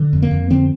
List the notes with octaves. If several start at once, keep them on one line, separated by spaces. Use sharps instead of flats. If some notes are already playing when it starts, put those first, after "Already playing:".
Already playing: D3
F2
A#3
F2
D3 C4